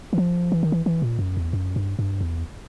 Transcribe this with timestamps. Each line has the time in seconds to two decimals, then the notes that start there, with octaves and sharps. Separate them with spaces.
0.13 E3
0.18 F3
0.52 E3
0.63 D#3
0.72 E3
0.86 E3
1.02 A#2
1.19 F#2
1.37 E2
1.53 F#2
1.76 G2
1.99 G2
2.21 E2